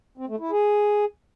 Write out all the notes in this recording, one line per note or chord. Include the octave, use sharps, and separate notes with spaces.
C4
A3
E4
G#4